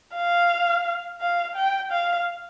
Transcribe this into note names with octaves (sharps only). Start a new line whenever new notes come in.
F5
F5
G5
F5